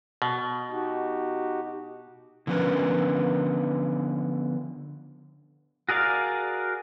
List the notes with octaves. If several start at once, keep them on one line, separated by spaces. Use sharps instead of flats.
B2
D#4 F#4 G4
D3 F3 B3 C#4 A#4 B4
F#4 G#4 A#4 D5 F5